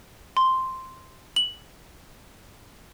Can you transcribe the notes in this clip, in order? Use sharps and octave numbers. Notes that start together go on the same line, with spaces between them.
C6
F#7